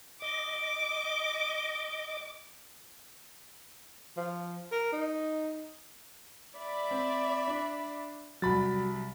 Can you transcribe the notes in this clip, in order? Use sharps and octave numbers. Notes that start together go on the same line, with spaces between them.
D#5 D6
F3
A#4
D#4
D5 E5 B5
C4
D4
C2 F#3 G3 F#4 B5 A6